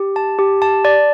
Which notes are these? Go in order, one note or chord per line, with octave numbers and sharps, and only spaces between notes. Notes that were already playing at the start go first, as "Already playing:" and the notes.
Already playing: G4
A5
G4
A5
D5